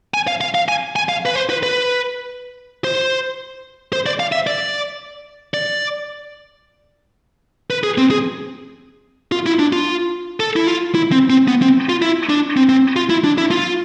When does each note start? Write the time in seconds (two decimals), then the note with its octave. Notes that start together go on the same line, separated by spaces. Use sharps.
0.14 G#5
0.27 F5
0.41 F5
0.55 F5
0.68 G#5
0.96 G#5
1.09 F5
1.26 B4
1.36 C5
1.50 B4
1.63 B4
2.84 C5
3.93 C5
4.06 D5
4.20 F5
4.32 E5
4.47 D5
5.54 D5
7.70 B4
7.83 G#4
7.98 C4
8.11 G#4
9.32 F4
9.46 E4
9.59 D4
9.73 F4
10.40 A4
10.56 E4
10.67 F4
10.95 E4
11.12 C4
11.30 C4
11.48 B3
11.62 C4
11.89 F4
12.02 E4
12.29 D4
12.57 C4
12.69 C4
12.96 F4
13.10 E4
13.24 D4
13.38 E4
13.51 F4